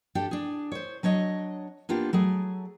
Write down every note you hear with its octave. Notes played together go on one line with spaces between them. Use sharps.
D4 G4 A4 G5
D4 G#4
C5 C#5
F#3 D4 C#5 D#5
A#3 B3 D4 F4 G4
F#3 A3 G#4